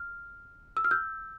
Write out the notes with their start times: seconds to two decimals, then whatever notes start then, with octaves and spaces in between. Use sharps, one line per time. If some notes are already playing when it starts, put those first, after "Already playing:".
Already playing: F6
0.77 E6
0.84 F6
0.91 E6 G6